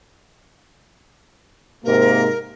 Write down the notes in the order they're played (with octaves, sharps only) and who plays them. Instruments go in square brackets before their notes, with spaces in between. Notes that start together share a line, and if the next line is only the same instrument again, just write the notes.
[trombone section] G#2 C3 A#3 [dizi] A#4